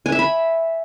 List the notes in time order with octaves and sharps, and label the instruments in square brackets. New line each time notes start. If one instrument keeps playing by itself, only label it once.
[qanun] G#5
E5
B5